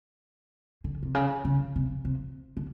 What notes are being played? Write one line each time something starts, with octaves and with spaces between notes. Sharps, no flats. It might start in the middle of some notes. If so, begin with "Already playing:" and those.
D3
C3
C#3
C#3
C3
C3
D3